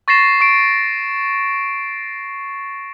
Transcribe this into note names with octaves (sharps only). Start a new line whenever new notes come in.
C#6 A6 A#6 C7 E7
C#6 D7